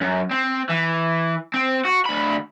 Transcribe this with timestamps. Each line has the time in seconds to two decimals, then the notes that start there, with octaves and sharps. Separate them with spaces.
0.01 F#2
0.31 C4
0.69 E3
1.54 C4
1.85 F#4
2.05 D2 B5